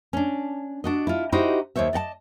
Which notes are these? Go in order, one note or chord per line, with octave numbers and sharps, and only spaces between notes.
C#4 D4
D4 F#4 D#5
E4 F4
D#4 E4 F#4 G4 C5 D#5
D#2 G#2 C5 C#5 E5
D5 D#5 F#5 A5